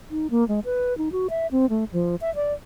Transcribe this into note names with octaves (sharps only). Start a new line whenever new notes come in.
D#4
A#3
G#3
B4
D#4
F#4
E5
C4
A3
F3
E5
D5